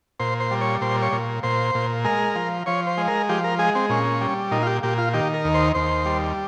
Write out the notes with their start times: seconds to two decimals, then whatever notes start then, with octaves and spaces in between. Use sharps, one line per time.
0.20 A#2 C5
0.40 C5
0.51 G3
0.61 C#5
0.81 A#2 C5
1.02 C#5
1.12 A#2
1.43 A#2 C5
1.75 A#2
2.05 G#3 A#4
2.35 F3
2.66 F3 C#5
2.87 C5
2.98 G#3
3.08 A#4
3.29 F3 G4
3.44 A#4
3.59 G#3 G#4
3.75 C4
3.90 A#2 C#4
4.21 G3
4.51 A#2 D#4
4.62 F4
4.67 G4
4.83 A#2 G4
4.98 F4
5.14 D#3 G4
5.34 A#4
5.44 D#2
5.54 C5
5.75 D#2 C5
6.05 G3